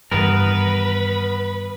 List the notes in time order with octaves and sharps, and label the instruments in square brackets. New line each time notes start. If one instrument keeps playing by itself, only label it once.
[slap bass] G2 D#3 E3 [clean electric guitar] B3 A#4 [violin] B4